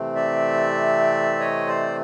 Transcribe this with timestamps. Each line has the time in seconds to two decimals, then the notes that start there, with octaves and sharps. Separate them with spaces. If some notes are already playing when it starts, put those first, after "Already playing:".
Already playing: C3 E3 A3 C4
0.15 D5 E5
1.39 C#5 D#5
1.67 C5 D5